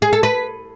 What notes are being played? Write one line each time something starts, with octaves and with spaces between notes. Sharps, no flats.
G#4
A4
B4